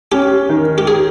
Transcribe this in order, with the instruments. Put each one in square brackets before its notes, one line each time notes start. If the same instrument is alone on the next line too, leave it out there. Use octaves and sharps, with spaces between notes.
[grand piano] C#4 [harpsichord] G4
[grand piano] D#3
[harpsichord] G4
G#4